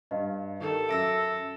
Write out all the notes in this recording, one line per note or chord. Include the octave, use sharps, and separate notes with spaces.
G2 D#5 F5
D#3 G4 A4 A#4
F#2 E5 D6 E6 A#6 D7